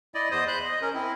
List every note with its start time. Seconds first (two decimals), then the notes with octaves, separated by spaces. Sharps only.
0.15 E4 D5 D#5
0.31 E2 C5 D#5 D#6
0.48 C5 B5 F#6 G6
0.65 D#5
0.82 C#4 A#4
0.94 C4 E4